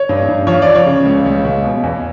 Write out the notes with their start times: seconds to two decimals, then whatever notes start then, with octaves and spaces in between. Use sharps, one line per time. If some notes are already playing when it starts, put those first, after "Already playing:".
Already playing: C#5
0.09 G2
0.28 G2
0.47 F3 C#5
0.62 D5
0.67 F3
0.75 C#5
0.86 C#3
1.05 C#2
1.26 C#2
1.45 C#2
1.64 B2
1.83 E2